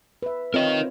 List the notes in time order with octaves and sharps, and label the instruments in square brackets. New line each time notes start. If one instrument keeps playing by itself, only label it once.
[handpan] B4 E5
[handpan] C4 F4 C#5 [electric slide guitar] A#4 D#5